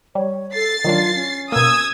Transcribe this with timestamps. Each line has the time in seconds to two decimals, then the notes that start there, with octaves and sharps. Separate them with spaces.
0.15 G3 C#5
0.55 A4 A6 C7
0.84 D#3 F#3 D4 F4
1.15 C#4
1.52 B2 A#3 D#6 E6 G#6